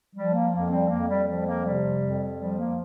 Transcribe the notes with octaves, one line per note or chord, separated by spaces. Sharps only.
F3 G3
A#3
F2 A#3
G3 C4
F2 A#3
G3
F3 G3
A#3
C3 G3
F2
F3 G3
A#3